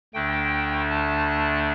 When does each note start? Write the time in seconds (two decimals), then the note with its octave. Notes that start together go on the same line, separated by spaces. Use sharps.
0.14 D2 D3 A3 D4 G5
0.90 A5